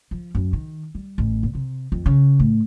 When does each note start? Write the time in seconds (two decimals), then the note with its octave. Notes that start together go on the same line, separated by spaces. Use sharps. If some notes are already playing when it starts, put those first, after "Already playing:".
0.11 F3
0.35 F#2
0.53 D#3
0.95 G3
1.18 A1
1.43 A#2
1.55 C3
1.92 F2
2.06 C#3
2.39 A2